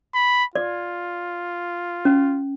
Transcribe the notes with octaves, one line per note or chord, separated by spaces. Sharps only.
B5
F4 D5
C#4